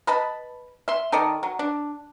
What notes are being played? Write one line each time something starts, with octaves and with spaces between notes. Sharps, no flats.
B4 D#5 A5 B5
E5 C6
D#3 A4 D5 D#5
F#3
D4